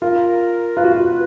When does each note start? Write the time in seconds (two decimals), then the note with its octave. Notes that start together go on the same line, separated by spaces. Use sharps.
0.02 F4 A#4
0.77 F4 B4
0.84 F#4
0.92 F4